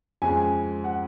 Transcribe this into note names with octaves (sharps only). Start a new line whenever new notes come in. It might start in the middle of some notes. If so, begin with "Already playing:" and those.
F2 C#3 G#3 G#5
F#5